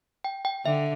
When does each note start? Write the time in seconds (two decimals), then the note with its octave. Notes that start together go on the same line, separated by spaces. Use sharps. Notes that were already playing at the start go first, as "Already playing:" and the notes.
0.24 G5
0.45 G5
0.65 D3 E5